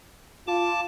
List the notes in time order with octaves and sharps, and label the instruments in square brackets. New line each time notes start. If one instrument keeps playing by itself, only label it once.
[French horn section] F4 [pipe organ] A5 D6